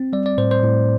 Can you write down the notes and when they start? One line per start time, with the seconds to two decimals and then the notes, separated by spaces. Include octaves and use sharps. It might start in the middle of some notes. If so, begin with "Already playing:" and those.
Already playing: C4
0.13 G3 D5
0.26 D5
0.38 A2 C5
0.51 C5
0.63 A2